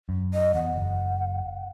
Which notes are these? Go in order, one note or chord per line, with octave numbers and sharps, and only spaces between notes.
F#2
D#5
E2 F#5
F#1